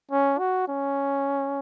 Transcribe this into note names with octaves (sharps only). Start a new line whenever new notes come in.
C#4
F#4
C#4